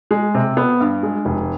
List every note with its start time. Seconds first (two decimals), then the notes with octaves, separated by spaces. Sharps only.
0.11 G#3
0.34 C3
0.57 B3
0.80 G2
1.03 G#3
1.25 F1